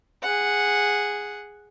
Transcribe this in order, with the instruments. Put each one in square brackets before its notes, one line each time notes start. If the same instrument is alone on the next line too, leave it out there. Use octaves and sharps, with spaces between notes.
[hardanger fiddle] G#4 F#5